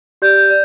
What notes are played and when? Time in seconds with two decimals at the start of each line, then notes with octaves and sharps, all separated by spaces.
0.22 G4 D5 G6
0.36 G6
0.50 D5